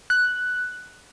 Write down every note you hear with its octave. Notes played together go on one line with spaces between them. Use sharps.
F#6